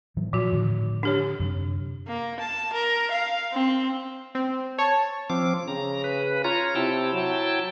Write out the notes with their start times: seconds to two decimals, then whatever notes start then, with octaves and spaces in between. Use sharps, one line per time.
0.17 A2 E3 F#3
0.33 A#2 F3 F#4
0.52 A2 D3 D#3
1.03 D4 G4 C#5
1.40 F#2 C3
2.08 A#3
2.40 A5
2.73 A#4
3.11 F5
3.53 C4
4.35 C4
4.79 C#5 A5
5.30 F3 C4 D6
5.68 C#3 A#5
6.04 B4
6.44 F4 C#5 A#5
6.75 C3 E4 G5 A5
7.13 F#3